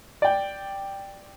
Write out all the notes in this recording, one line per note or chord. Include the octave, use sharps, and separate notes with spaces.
D5 G5